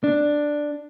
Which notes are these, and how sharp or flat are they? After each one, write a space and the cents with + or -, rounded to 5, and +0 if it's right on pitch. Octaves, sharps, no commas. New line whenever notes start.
D4 +5